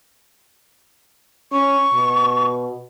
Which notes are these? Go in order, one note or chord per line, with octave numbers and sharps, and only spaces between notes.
C#4 C#6
B2